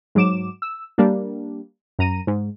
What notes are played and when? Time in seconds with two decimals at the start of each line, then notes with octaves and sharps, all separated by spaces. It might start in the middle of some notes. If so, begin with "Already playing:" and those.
0.15 G#2 F#3 D6 E7
0.62 E6
0.98 G3 A#3 D4
1.99 F#2 A#5 D#7
2.27 G#2